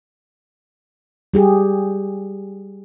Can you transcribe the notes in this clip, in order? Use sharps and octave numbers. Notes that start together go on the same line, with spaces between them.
G3 G4 G#4